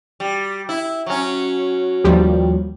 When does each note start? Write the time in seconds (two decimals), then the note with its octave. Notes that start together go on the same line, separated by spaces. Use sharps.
0.20 G3
0.69 E4
1.06 F#3 C#4
2.04 D#2 F3 G3